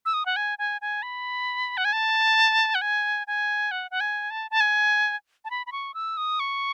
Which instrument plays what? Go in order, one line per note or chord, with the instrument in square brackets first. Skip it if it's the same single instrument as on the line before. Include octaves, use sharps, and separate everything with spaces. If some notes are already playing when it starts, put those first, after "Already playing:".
[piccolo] E6
D#6
F#5
G#5
G#5
G#5
B5
F#5
G#5
A5
F#5
G#5
G#5
F#5
F#5
G#5
A5
A5
G#5
A5
B5
B5
C#6
E6
D#6
C#6